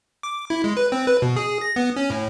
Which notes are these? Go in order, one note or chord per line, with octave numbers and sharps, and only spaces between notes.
D6
E4
G#3
B4
C4
B4
B2
G#4
A#6
B3
C#4
A2